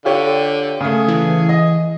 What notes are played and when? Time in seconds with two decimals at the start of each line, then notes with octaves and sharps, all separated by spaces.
0.05 D3 F4 G4 C#5
0.81 C#3 A3 G#4
1.08 E3
1.49 D#5